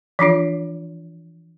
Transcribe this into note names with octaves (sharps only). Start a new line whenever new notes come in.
E3 F3 D4 F4